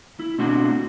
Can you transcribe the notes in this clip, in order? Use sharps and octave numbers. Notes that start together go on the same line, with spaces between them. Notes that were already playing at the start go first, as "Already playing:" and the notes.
E4
B2 A3 C4 D4 F#4